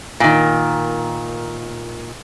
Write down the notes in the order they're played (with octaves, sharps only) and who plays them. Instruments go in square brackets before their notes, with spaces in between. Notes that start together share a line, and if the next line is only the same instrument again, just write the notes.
[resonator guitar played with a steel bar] A#2 D#3